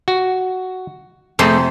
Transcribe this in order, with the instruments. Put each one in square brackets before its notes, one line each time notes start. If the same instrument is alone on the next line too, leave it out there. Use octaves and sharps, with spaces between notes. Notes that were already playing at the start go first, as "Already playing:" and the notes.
[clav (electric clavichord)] F#4
[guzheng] F2 C3 C5 [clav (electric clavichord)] A3 G#4 A4